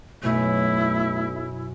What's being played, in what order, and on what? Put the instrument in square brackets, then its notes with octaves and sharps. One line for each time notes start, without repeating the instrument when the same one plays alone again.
[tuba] B1 [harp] F#2 B2 [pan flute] A3 [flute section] E4